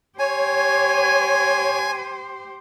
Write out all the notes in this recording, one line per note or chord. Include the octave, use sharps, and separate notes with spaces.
G4 C5 C#5 G#5